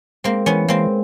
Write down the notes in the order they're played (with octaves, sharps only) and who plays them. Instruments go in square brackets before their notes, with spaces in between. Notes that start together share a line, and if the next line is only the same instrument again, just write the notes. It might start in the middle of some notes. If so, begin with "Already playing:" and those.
[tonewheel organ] G#3 [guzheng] A#3 C4
[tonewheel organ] E3 [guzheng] B3 C#4
[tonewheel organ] G#3 [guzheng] A#3 C4